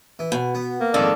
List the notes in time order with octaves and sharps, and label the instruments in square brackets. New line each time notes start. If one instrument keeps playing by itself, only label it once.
[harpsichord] E3
[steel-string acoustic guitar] B2 [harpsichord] G#5
[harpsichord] B3
[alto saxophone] A#3
[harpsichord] F2 G#2 [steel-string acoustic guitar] D#3 [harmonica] A4 D5